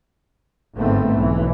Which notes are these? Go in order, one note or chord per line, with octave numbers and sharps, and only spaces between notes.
G1 G#2 D#3 A3 B3 C4
B1 E3